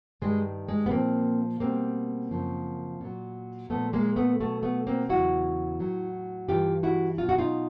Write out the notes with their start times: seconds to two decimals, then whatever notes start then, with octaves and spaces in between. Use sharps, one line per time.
0.22 G2 D#3 G3 G#3
0.69 G#3
0.86 B3
0.91 A#2 F3 A#3 C4
1.60 B2 G3 A#3 C4
2.31 F#2 C#3 F3
3.01 A#2 F#3
3.70 A#2 F3 A3 B3
3.93 G#3 A#3
4.16 A3 B3
4.40 B2 F#3 A3 B3
4.63 A3 B3
4.87 A#3 C4
5.09 E2 C#3 F#3 E4 F#4
5.79 A2 F#3
6.48 G2 E3 G3 F4 G4
6.83 E4 F#4
7.18 B2 F#3 F4
7.29 F#4
7.38 D#4 F4